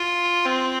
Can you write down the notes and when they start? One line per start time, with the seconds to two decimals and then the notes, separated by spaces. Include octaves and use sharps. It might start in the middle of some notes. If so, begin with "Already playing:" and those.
Already playing: F4
0.46 C4